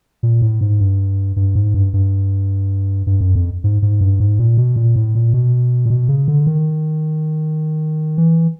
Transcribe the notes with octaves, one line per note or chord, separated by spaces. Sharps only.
A#2
A2
G#2
G2
G2
G#2
G2
G2
G2
F#2
F2
G#2
G#2
G2
G#2
A#2
B2
A#2
A2
A#2
B2
A#2
B2
C#3
D3
D#3
E3